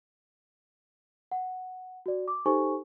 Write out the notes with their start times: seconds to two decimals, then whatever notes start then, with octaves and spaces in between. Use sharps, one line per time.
1.32 F#5
2.06 F#4 D5
2.28 D6
2.46 D#4 G4 A4 C5 G#5 C#6